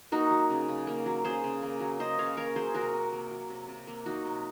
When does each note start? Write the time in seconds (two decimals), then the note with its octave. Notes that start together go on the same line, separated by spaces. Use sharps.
0.12 A#3 D#4 F#4
0.31 F#3
0.50 C#3
0.68 C#3
0.87 A#3
1.06 F#3
1.24 C#3 G#4 C5
1.44 C#3
1.62 A#3
1.80 F#3
1.99 C#3 C5 D#5
2.18 C#3 C#5 F5
2.37 A#3 A#4 C#5
2.55 F#3 G#4 C5
2.74 C3 F#4 A#4
2.93 C3
3.12 A#3
3.31 F#3
3.50 C3
3.68 C3
3.87 A#3
4.06 F#3 D#4 F#4
4.25 C3